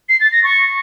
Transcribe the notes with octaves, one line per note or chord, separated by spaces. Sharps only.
C7
A6
A#6
C#6